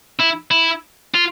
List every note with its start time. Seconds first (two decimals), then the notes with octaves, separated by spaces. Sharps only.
0.20 E4
0.51 E4
1.14 F4